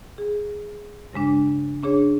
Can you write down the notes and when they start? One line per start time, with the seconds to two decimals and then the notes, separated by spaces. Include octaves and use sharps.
0.18 G#4
1.13 G2 C#3 G#3 D4
1.83 C#4 D4 G#4 C#5